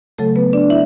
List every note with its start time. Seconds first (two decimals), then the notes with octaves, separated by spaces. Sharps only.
0.18 C#3 F#3 A3 A4
0.36 B3 B4
0.53 D4 D5
0.70 E4 E5